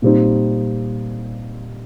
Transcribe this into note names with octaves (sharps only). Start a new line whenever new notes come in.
A#2 G3 C4 D#4